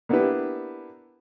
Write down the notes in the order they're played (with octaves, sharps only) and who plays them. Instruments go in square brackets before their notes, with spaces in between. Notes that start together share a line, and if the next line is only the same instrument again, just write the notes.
[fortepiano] A#3 B3 D4 E4 G4 B4